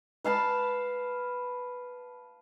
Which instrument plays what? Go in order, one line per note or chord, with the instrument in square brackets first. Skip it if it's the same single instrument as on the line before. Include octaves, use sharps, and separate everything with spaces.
[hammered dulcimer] B4 F5 A5 B5